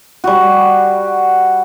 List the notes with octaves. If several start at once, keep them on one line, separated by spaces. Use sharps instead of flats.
G3 F#4